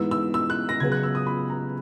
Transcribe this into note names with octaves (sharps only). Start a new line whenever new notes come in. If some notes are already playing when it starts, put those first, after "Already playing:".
Already playing: G#2 E3 B3 E6
E6
E6
F#6
A#6
C#3 F#3 B3 G#6
F#6
E6
D#6
B5
A#5